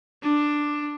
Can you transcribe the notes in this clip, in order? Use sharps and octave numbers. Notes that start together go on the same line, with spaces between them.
D4